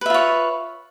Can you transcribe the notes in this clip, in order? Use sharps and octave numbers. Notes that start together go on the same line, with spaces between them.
F4 B4 C#5 E5